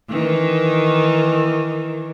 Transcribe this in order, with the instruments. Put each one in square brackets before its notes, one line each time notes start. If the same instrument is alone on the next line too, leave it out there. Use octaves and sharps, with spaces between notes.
[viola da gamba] D#3 E3